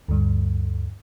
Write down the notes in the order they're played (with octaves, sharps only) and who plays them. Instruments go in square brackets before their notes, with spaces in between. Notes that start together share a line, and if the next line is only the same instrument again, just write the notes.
[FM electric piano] D2 G2